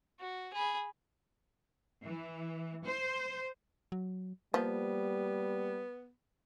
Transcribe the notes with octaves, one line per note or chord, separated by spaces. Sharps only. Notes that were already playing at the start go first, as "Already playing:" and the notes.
F#4
G#4 B5
E3
C5
F#3
F3 G3 A#3 B3